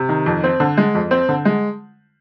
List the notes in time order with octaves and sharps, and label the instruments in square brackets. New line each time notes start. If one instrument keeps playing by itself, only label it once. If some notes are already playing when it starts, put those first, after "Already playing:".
Already playing: [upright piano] C3
D#3
F2
C4
D3
G#3
F2
C4
D3
G#3